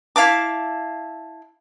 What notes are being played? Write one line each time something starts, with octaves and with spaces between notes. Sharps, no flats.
E4 F5 A5 D6